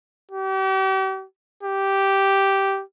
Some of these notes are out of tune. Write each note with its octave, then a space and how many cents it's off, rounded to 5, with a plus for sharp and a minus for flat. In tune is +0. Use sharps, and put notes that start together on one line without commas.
G4 -40
G4 -5